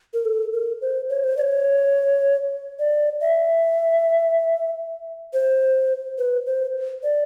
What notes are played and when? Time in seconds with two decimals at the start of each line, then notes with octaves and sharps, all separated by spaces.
0.14 A#4
0.25 A4
0.53 A#4
0.81 C5
1.09 C#5
1.24 C5
1.37 D5
1.41 C#5
2.79 D5
3.21 E5
5.34 C5
6.18 B4
6.46 C5
7.03 D5